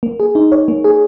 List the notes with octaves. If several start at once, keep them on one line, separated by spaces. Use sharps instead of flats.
A#3
G#4
D#4
C#5
A#3
G#4